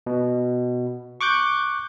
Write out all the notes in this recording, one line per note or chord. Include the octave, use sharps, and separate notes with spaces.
B2
C#6 D6 F#6 G6